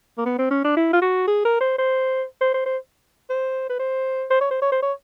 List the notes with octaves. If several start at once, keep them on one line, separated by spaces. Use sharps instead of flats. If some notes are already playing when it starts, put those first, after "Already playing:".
A#3
B3
C4
C#4
D4
E4
F4
F#4
G#4
A#4
C5
C5
C5
C5
C5
C5
B4
C5
C5
C#5
C5
C#5
C5
C#5